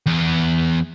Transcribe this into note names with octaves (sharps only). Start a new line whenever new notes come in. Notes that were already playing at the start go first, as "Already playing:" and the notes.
E2 B3